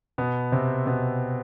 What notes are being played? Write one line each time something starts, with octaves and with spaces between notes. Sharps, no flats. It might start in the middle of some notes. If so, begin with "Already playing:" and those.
B2 B3
C3 C4
B2 B3